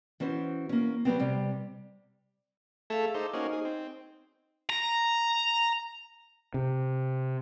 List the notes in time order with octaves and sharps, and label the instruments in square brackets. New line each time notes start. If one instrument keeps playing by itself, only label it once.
[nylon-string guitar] E3 C#4 F#4 C5
A#3 C#4
F#3 G3 B3 C4
C3 G3
[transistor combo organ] A3 A4 E5 [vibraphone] G#4 F5
[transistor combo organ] D#4 A4 C5 [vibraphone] D6
[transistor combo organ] A#3 C#4 F#4 [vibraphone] D#4 C5 D#5
[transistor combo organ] G#4
C4
[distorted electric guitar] A#5
[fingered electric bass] C3